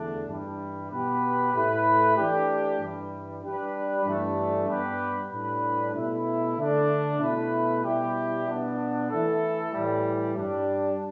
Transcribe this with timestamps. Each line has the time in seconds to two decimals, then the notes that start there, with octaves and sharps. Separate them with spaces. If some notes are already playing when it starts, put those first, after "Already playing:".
Already playing: E2 D3 A3 D4
0.27 G2 E3 G3
0.90 B2 B3 G4 B4
1.52 A2 A3 E4 B4
2.16 E3 A3 D4 G4
2.79 G2 E3 G3
3.43 G3 D4 G4 B4
4.05 G2 E3 A3 D4
4.68 G2 G3 B3 G4 B4
5.31 A2 G3 D4 B4
5.94 B2 A3 E4
6.58 D3 A3 D4
7.20 B2 A3 E4 B4
7.84 B2 G3 E4 G4
8.47 B2 B3 D4
9.09 E3 A3 E4 A4
9.73 A2 E3 G3
10.36 G2 G3 D4